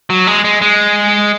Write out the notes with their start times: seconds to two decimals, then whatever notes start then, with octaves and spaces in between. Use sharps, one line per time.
0.10 F#3
0.27 G#3
0.44 G#3
0.62 G#3